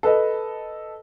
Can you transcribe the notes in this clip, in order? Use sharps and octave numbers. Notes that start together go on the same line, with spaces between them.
A4 B4 D#5